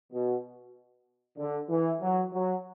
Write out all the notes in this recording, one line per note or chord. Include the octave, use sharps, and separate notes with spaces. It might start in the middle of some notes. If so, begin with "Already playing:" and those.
B2
D3
E3
F#3
F#3